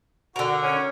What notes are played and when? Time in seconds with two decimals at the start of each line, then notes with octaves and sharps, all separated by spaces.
0.36 D3 F#4 A#4
0.63 C#4